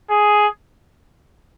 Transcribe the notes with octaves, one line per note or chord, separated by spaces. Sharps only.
G#4